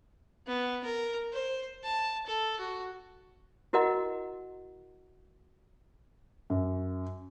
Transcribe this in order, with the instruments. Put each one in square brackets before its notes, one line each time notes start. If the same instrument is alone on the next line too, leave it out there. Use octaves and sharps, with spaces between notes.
[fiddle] B3
A#4
C5
A5
A4
F#4
[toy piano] E4 F#4 A#4 D#5 F#5 A#5
[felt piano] F#2